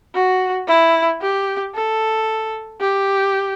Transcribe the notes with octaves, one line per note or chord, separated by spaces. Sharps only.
F#4
E4
G4
A4
G4